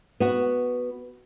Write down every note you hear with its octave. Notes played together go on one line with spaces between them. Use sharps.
B3 F#4